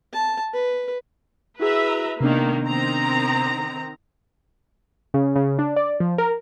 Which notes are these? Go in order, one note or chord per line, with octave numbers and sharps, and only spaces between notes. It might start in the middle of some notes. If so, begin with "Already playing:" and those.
A5
B4
E4 F#4 G#4 B4 E5 A#5
C3 D#3 A#3 B3 D4
D#3 C4 A#5
C#3
C#3
D4
D5
F3
A#4